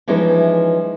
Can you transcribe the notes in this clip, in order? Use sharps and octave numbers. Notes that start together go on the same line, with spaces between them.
E3 F3 G#3 C#4 D#4 B4